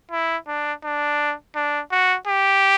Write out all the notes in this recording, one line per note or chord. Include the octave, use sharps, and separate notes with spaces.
E4
D4
D4
D4
F#4
G4